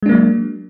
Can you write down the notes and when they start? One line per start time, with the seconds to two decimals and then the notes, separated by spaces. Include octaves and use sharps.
0.03 G#3
0.06 D4
0.09 A#3
0.12 F#3